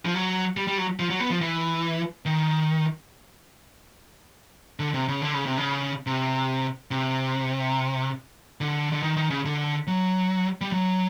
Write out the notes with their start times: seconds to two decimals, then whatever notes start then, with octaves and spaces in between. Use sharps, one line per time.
0.05 F3
0.14 F#3
0.57 G3
0.67 G3
0.78 F#3
0.99 F3
1.10 F#3
1.20 B3
1.30 F3
1.41 E3
2.25 D#3
4.79 D3
4.94 C3
5.08 C#3
5.22 D3
5.34 C#3
5.46 C3
5.57 C#3
6.06 C3
6.91 C3
8.61 D3
8.92 D3
9.02 D#3
9.17 D#3
9.30 C#3
9.45 D3
9.87 F#3
10.61 G3
10.72 F#3